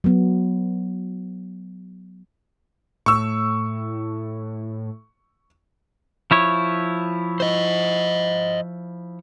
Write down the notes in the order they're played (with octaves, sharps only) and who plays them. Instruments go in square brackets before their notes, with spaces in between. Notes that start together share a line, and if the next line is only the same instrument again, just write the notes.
[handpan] F#3 B3
[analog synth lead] A2 [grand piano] C#6 E6
[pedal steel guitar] F3 E4 C#5
[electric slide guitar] C5 D#5